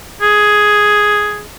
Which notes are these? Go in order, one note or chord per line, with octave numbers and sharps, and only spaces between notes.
G#4